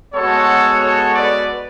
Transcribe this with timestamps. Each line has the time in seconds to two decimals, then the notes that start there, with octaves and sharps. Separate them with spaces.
0.13 G#3 B3 F#4 A4 C#5
0.81 A4 C#5
1.14 B4 D5